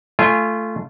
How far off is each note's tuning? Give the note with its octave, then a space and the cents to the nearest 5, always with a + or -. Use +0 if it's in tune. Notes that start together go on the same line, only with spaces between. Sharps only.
A3 +0 F4 -20 G#5 +0